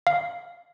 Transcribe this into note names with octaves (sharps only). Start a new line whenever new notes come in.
F5